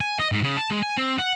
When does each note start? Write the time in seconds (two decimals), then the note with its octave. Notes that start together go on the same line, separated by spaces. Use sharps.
0.01 G#5
0.20 D#5
0.32 G#2
0.43 C#3
0.57 A5
0.70 G#3
0.83 G#5
0.97 C4
1.19 F#5